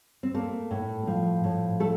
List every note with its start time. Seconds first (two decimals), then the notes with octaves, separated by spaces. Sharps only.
0.23 C4
0.34 A3 A#3
0.71 A2
1.07 F3
1.44 A2
1.80 A3 A4